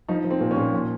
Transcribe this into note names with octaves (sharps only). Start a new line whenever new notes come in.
F3 D#4
F3
C4
A#2
C#4
A#2
F3